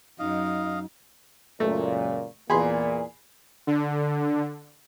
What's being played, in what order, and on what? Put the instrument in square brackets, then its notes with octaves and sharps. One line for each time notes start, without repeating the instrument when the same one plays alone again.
[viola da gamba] F#2 [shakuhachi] D#4 [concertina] D#5 F5
[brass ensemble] C#2 F#2 A#2 [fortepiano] A3
[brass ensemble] E2 A#2 [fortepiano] G#4 B5 C6
[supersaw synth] D3